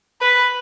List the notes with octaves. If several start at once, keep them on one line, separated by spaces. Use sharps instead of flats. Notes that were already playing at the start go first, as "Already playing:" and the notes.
B4